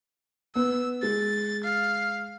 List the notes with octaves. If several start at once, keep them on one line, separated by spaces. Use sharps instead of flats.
B3 E6
G#3 A6
F5